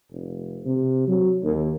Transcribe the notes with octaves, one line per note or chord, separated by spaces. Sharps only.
F1
C3
F#3
D#2